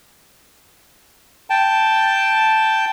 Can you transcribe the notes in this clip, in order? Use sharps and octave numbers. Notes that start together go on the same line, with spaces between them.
G5 A5